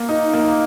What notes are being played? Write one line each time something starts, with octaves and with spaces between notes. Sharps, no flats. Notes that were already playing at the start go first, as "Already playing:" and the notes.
Already playing: A#3
D#4
A#3